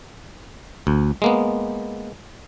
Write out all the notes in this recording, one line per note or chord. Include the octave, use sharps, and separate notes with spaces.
D2
G#3 A#3 B3